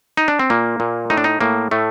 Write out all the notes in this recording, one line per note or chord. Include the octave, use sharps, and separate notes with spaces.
D#4
D4
C4
A#2 A#3
A#2
A2 D#4
D4
D#4
A2 A#3
A2 A3